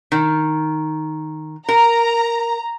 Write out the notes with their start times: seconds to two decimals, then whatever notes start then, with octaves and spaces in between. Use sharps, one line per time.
0.12 D#3
1.69 A#4 A#5